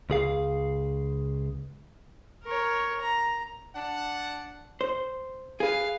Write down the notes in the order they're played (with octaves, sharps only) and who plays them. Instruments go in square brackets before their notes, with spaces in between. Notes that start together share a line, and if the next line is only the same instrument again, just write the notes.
[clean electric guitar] C#2 G#4 F5
[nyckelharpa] A#4 C#5
A#5
[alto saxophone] D4 [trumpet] F#5
[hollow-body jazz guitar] C5
[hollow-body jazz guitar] G#4 B4 [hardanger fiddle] F5